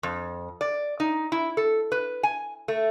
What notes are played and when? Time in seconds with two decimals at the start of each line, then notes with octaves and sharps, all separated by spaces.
0.03 F2
0.61 D5
1.00 D#4
1.32 E4
1.57 A4
1.92 B4
2.23 G#5
2.68 A3